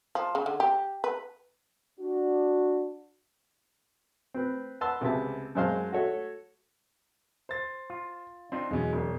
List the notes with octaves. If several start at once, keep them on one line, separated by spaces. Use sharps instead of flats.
F3
C#3
D3
G4
B4
D4 F#4
C4 B4
B4 F#5 A5 C6 E6
C#2 C3 B3 E5 A5
F#2 F#3 G#3 C5 F5 A5
F#4 A4 C#5 E5
C5 A6
F4
C4 D4 D#4 F4
E2 B2 F#3 G#3 C#4
E1